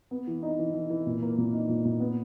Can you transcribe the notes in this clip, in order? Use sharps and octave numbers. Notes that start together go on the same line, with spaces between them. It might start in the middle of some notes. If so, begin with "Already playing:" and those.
B3
E3
D#4
E3
E3
E3
A#2
A#3
A#2
D#4
A#2
A#2
B3